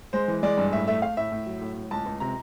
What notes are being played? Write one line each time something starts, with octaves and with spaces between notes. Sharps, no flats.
G#3 C5
E3
G#3 D5
G2
A2 E5
A3 E5
A3 F5
A2 E5
A2
F#3
A2
A2
C#2 A5
C#2
C3 A#5